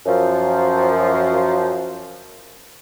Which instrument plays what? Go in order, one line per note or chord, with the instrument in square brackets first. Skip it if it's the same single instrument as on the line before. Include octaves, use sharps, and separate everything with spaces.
[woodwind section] F#2 F3